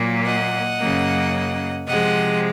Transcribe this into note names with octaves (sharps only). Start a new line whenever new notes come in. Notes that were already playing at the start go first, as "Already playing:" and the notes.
Already playing: A#2 F#3 A#3
D#5 F#5
F#2 C#3 F#3 A#3
C3 F3 G#3 D#5 F#5